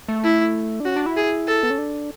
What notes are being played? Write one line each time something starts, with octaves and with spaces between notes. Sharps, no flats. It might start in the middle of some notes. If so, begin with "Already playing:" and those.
A3
E4
D4
C#4 F#4
D4
E4
G#4
A4
B3
C#4
D4